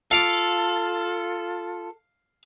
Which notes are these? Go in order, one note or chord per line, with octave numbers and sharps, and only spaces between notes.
F4 A4 F5 D6